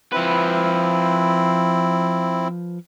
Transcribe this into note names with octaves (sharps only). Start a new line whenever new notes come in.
F3 C4 E4 B4